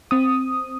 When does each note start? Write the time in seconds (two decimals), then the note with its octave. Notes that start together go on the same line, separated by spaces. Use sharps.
0.11 C4 D#6